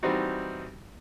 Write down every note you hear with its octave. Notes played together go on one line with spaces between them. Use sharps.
E3 G3 C4 D#4 F#4